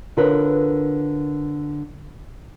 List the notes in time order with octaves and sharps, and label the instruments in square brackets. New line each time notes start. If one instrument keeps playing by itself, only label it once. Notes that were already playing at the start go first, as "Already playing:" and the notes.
[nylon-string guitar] D3 F4 A#4 B4 C#5